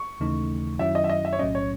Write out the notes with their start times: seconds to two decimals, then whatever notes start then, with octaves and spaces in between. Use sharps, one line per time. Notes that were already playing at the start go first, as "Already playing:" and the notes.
Already playing: C#6
0.20 D#2 C#3 E3 A3 D#4
0.79 F#2 D#3 F#3 C#4 E4 E5
0.95 D#5
1.04 E5
1.09 D#5
1.25 E5
1.33 C#5
1.39 B1 A2 F#3 C#4 D#5
1.55 C#5